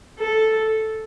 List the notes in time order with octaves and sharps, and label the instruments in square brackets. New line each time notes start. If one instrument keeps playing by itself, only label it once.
[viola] A4